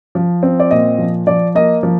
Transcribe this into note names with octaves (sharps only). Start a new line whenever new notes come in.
F3
C4
D5
A#2 D#5
F3
F3 D5
A#3 D#5
F3